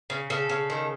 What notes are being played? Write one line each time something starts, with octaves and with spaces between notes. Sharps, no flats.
C#3
C#3 A4
C#3
D#3